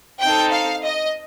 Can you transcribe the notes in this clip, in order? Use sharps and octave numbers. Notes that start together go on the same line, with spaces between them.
C4 D#4 A4 G5
F5
D#5